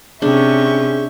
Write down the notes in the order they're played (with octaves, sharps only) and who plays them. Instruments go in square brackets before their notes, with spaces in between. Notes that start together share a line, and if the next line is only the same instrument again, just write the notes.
[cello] C3 C#4 [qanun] D4 [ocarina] G#4 [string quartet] E5 C#6 G6